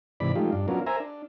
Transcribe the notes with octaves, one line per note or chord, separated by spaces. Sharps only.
G#2 C3 E3 D5 B5
F3 G#3 A3 D#4 F4 G4
G2 D4
F#3 B3 C#4 D4 F4 A#4
A#4 C5 E5 G#5 A#5
D4